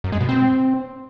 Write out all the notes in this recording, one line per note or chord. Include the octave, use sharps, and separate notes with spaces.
F#2
G#3
B2
C4